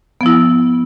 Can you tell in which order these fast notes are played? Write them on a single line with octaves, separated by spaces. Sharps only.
B3 F3 E4